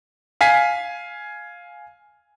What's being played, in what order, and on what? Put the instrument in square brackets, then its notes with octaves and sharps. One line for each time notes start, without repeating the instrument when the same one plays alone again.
[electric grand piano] F5 G#5 B6 C7